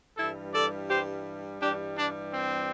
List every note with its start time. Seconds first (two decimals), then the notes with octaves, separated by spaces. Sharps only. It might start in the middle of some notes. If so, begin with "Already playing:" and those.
0.17 G2 E3 G3 E4 A4
0.53 A4 D5
0.89 G4 C5
1.60 G2 E3 G3 D4 G4
1.96 D4
2.32 C4